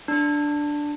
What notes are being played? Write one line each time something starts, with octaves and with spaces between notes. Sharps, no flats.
D4